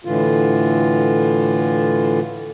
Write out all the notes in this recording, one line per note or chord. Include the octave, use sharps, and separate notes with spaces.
A2 D3 E3 F4